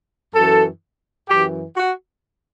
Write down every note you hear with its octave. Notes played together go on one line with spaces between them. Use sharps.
F#2 E3 A4
F#2 E3 G4
F#4